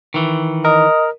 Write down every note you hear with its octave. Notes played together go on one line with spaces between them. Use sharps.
D#3 E3
A#4 D#5